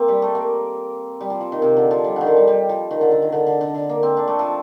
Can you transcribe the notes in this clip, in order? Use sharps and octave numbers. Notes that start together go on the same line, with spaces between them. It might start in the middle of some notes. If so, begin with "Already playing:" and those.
Already playing: A#3 C4
G3
A3
A#3
G3
F3
F3
D#3
C3
D3
F3
G3
D3 D#3
F3
G3
G3
F3
D#3
D3
D3
D#3
D3
D3
D3
D3
A#3
C4
D4
A3
F3